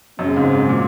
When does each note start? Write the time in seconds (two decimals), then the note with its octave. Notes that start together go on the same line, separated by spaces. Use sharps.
0.19 F#2 C#3 F#3 C4
0.36 G#2
0.52 G#2
0.69 A#2